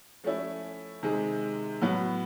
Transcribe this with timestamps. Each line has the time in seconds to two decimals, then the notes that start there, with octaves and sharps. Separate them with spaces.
0.24 F3 A3 C#4 E4
1.03 C3 D#3 G#3
1.82 A2 F#3 B3